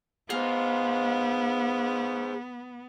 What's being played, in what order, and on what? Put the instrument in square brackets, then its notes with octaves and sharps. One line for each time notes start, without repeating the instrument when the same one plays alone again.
[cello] B3 [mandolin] F4 [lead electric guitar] G#4 C5